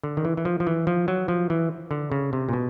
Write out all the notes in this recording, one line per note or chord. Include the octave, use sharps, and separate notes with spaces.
D3
D#3
E3
E3
F3
F3
E3
F3
F#3
F3
E3
D3
C#3
C3
A#2
B2